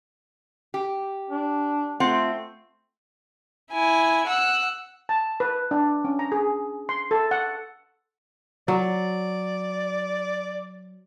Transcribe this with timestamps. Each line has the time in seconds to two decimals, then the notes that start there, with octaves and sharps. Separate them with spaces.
0.74 G4
1.30 D4
2.00 A3 C4 F4 F#5
3.72 E4 G#5
4.27 F#5 E6
5.09 A5
5.40 B4
5.71 D4
6.05 C#4
6.19 A#5
6.32 G#4
6.89 C6
7.11 A4
7.31 F#5
8.68 F#3 D5